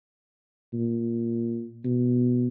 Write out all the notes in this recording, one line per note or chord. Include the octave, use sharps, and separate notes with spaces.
A#2
B2